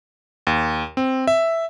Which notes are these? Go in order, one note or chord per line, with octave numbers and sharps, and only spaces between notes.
D#2
C4
E5